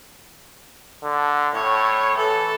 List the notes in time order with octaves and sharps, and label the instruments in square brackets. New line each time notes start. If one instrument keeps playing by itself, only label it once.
[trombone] D3
[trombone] A2 [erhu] C#5
[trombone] E3 [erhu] A4